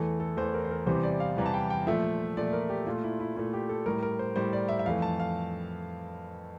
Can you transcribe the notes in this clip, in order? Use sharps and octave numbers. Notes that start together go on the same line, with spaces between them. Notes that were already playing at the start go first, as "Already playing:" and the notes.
Already playing: E2 E3 A3 A4
A4
E2 E3 A3 C5
A#4
C5
A#4
E2 C3 E3 G3 C5
D5
F5
E2 C3 E3 G3 A#5
A5
G5
G5
A#2 F3 A3 E5
A#2 F3 A3 D5
A#4
G4
A#2 A3 F4
E4
E4
A#2 A3 E4
G4
A4
A2 G3 A#4
A#4
C5
A2 G3 C5
D5
E5
E5
F2 E3 A3 F5
A5
F5